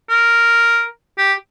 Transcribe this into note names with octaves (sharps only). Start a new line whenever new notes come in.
A#4
G4